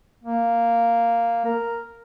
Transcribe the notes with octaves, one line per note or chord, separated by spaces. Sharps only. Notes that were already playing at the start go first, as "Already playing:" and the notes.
A#3
A#4